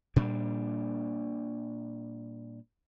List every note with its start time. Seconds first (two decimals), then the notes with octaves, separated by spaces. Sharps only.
0.16 A#2 G3 D4